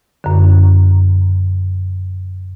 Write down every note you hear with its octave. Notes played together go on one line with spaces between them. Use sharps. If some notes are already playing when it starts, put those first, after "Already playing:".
F#2 D3